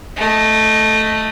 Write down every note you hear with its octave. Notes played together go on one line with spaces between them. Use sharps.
A3 D#5